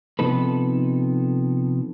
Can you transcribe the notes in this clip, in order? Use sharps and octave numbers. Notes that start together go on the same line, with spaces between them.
C3 F3 B3 D#4 A4 B4